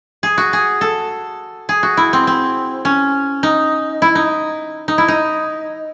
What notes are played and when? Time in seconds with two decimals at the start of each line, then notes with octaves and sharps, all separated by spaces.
0.23 G#4
0.38 F#4
0.53 G#4
0.81 A4
1.69 G#4
1.83 F#4
1.97 E4
2.13 C4
2.27 C4
2.85 C#4
3.43 D#4
4.02 E4
4.15 D#4
4.88 D#4
4.98 E4
5.08 D#4